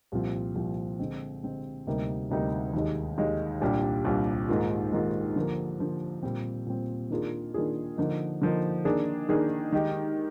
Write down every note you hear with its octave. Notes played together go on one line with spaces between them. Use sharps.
C2 A#2 F3 C4 F4
C2 A#2 F3 C4 F4
D3 G#3 C4
D3 G#3 C4
D2 C3 G3 A#3 D#4
D2 C3 G3 A#3 D#4
D#2 D#3 G#3
D#2 D#3 G#3
C2 A#2 G3 D4 G4
C2 A#2 G3 D4 G4
G#2 D#3 A#3 F4
G#2 D#3 A#3 F4
D3 F3 A#3
D3 F3 A#3
A#2 G3 C4
A#2 G3 C4
D#3 A#3 D4 F4 G#4
D#3 A#3 D4 F4 G#4
D3 F3 A#3 D#4
D3 F3 A#3 D#4
D#3 A#3 D4 G#4
D#3 A#3 D4 G#4
D#3 G#3 D#4 G4